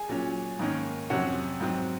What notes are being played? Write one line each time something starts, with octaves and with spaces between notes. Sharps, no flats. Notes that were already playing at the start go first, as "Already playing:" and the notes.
Already playing: G#4 G#5
A#2 F#3 C#4
G#2 D#3 A#3 C#4
F2 C3 F#3 C#4 F#4 F#5
G#2 F#3 C4